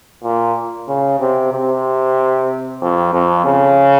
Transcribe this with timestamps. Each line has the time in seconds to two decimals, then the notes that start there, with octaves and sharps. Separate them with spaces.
0.24 A#2
0.88 C#3
1.20 C3
1.52 C3
2.81 F2
3.13 F2
3.45 C#3